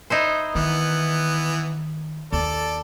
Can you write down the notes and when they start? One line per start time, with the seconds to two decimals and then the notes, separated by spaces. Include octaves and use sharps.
0.10 D#4 E4 C5
0.55 D#3 E3 B3
2.33 D#2 A4 D5